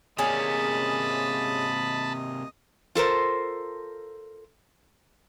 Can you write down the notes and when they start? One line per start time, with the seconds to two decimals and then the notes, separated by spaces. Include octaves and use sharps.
0.18 C3 A#3 C#4 G#4 D#5 A5 B5
2.95 F4 A4 A#4 C5